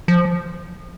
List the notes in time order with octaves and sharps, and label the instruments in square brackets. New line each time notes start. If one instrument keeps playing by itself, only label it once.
[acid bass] F3